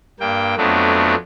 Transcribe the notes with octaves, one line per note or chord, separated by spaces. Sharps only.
G2 A#3 G5
F2 F#3 A3 B3 D4